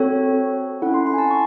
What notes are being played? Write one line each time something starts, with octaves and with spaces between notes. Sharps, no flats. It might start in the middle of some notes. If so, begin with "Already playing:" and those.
Already playing: C4 F#4 A4 C#5
C#4 E4 A4 F#5
C6
C6
G#5
A5
C#6